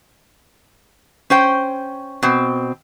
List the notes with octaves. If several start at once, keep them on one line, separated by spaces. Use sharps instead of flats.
C#4 C5 G5
B2 C4